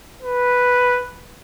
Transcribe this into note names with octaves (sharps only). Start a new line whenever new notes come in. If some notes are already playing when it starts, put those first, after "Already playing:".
B4